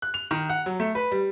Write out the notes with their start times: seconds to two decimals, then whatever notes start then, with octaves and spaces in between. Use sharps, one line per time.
0.02 F#6
0.14 F7
0.31 D#3
0.49 F#5
0.66 F#3
0.80 A3
0.95 B4
1.12 G3